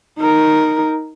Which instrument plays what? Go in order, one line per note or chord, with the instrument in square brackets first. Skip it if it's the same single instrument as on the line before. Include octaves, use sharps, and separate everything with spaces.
[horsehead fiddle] D#4 A#4